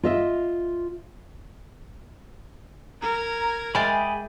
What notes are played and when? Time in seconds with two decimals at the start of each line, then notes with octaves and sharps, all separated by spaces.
0.03 F4 D#5 E5
3.02 A#4 A#5 G#6
3.75 G#3 G#4 D5 E5 G5 G#5 B5